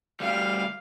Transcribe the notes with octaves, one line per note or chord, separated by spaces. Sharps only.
D2 G3 F5